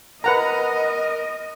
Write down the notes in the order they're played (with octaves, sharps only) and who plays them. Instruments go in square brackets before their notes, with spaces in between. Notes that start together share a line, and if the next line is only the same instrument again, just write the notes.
[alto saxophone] A#4 [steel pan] B4 F#5 A#5 [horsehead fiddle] D#5